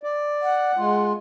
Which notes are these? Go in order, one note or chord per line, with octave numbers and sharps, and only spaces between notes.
D5
F#5
G#3 F4